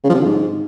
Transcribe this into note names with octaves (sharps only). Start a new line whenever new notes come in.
C#3
F3
C3
D3
G#2